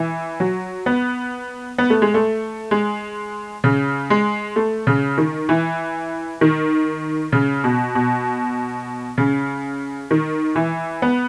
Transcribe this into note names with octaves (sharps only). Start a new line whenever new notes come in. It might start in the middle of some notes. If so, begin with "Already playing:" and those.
Already playing: E3
F#3
B3
B3
A3
G#3
A3
G#3
C#3
G#3
A3
C#3
D#3
E3
D#3
C#3
B2
B2
C#3
D#3
E3
B3